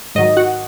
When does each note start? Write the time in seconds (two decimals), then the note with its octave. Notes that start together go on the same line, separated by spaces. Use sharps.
0.15 G#2 D#3 F#3 D#5
0.37 F#4 F#5